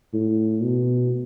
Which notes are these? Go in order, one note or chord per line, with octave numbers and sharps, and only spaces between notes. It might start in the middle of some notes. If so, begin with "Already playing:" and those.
A2
B2